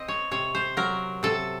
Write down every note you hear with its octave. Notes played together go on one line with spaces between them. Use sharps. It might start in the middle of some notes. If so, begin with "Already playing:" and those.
Already playing: C4 D#5
C#5
C3 C#5
C5
F#3 A#4
C3 A4